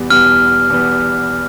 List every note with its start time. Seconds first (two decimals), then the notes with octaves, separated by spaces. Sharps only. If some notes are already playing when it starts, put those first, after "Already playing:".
Already playing: E2 B2 G3 B3
0.10 E2 B2 G3 B3 F6
0.70 E2 B2 G3 B3